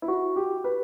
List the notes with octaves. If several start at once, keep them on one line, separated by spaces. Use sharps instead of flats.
E4
F#4
G4
B4